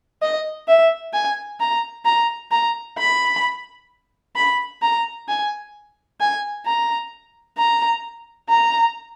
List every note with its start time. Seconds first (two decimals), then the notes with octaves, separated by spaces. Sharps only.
0.22 D#5
0.68 E5
1.13 G#5
1.60 A#5
2.05 A#5
2.51 A#5
2.98 B5
4.36 B5
4.82 A#5
5.28 G#5
6.20 G#5
6.66 A#5
7.58 A#5
8.50 A#5